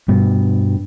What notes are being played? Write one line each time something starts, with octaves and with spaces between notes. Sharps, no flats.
G2 B2